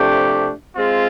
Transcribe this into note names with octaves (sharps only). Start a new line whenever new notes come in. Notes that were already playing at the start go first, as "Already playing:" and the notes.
Already playing: C3 F3 A3 D4 G4
G#3 C4 F4